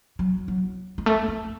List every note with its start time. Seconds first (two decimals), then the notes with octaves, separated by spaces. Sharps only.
0.19 F#3
0.48 F#3
0.98 G#3
1.06 A3
1.28 A3